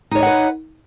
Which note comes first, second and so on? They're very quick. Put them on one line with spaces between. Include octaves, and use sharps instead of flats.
D#4 C#5 D#5 F#5 B4